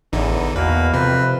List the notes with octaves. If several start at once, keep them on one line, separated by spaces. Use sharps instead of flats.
A1 E2 D3 E3 D#4
E2 B2 A#3 B4
F2 C3 C4 B4